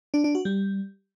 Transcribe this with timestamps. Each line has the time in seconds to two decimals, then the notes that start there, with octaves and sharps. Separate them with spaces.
0.14 D4
0.24 D4
0.35 F#4
0.45 G3